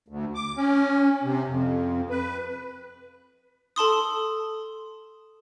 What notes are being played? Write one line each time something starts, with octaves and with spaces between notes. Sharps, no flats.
D2
D6
C#4
C3
F2
B4
A4 A5 C6 D#6